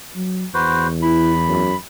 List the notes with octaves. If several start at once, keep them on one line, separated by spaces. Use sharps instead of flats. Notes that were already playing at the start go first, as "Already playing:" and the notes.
F#3
E2 F#4 B4 C5
E4 B5
F#2